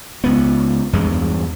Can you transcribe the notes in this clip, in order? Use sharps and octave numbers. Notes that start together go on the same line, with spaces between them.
C#2 B3
E2 G2 G#3